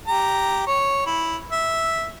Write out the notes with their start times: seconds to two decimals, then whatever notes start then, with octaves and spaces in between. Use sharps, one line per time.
0.07 G4 A#5
0.67 C#5
1.06 E4
1.52 E5